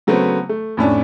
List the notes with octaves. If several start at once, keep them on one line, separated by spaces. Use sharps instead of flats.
C#3 F#3 A3 B3 C4
A3
F2 A2 C#4 D4